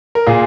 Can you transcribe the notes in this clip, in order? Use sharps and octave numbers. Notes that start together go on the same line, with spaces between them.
A#4
A#2 F4 G#4